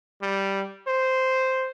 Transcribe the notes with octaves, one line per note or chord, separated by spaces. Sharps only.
G3
C5